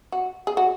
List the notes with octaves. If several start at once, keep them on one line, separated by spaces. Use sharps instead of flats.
F#4
G#4
F#4